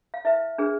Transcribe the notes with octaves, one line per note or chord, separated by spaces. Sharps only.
F5
E4 B4 E5
D4 G#4 B4